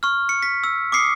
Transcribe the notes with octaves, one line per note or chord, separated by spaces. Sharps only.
C#6 F6
C#7
B6
E6
D6 D#6 C7 C#7